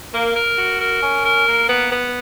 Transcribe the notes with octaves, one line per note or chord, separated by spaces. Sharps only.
A#3
A#4
F#4
A#4
C#4
A#4
A#3
B3
B3